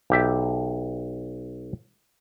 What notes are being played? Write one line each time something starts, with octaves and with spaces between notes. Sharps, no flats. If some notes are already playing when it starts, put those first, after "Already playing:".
B1 G4 E5